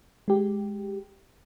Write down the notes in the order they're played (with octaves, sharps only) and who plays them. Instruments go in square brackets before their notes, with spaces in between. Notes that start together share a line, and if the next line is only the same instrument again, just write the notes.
[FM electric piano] G#3 G4